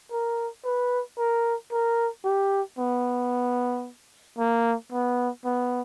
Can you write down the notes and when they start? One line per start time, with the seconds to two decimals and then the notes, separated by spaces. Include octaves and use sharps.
0.12 A#4
0.65 B4
1.18 A#4
1.72 A#4
2.25 G4
2.78 B3
4.38 A#3
4.92 B3
5.45 B3